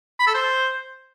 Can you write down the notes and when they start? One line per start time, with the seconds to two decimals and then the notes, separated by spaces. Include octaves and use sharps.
0.20 B5
0.27 A4
0.35 C5